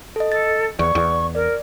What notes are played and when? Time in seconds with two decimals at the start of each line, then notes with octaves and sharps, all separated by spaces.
0.16 A4 D#5
0.32 A4 A6
0.79 E2 D5 C#6
0.95 E2
1.35 A#4 D5